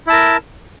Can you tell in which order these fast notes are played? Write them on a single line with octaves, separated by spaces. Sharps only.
E4 A5 A#4